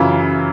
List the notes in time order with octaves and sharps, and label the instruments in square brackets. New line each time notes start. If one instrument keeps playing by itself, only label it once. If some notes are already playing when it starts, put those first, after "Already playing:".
Already playing: [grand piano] F#2 C#3 E3 F4